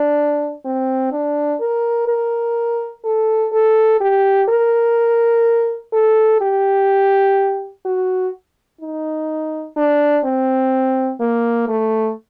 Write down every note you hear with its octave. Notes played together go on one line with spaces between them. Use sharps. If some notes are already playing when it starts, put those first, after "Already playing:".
Already playing: D4
C4
D4
A#4
A#4
A4
A4
G4
A#4
A4
G4
F#4
D#4
D4
C4
A#3
A3